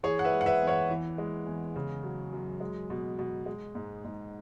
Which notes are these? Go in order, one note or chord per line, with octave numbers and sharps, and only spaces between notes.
E3 G#4 C#5
F#5
B4 E5
G#3
F#5
B4 E5
E2
C#5 F#5
E3
G#3
E2
C#3
F#3
F#2
G#3
B2
B2
G#3
G#2
G#2